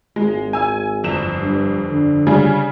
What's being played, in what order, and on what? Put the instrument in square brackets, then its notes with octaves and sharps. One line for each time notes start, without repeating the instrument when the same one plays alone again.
[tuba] G#1 [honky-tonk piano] G#3
[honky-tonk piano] G#5 E6
G1 F2 E7
[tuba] G2
D3
[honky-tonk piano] C#3 G3 G#4